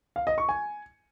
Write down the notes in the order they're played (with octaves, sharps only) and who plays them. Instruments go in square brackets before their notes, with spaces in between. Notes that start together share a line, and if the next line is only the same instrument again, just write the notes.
[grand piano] F5
D#5
C#6
G#5